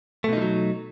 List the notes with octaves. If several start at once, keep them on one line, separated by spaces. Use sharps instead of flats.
B2 F3 F#3 A3 D#4